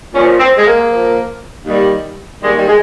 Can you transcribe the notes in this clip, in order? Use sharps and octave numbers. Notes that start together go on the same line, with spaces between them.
A#2 F3 C#4
C4
G#3
A#3
A#2 F3
D#2 D#3 G3
D#2 D#3 G3 G#3
G3
G#3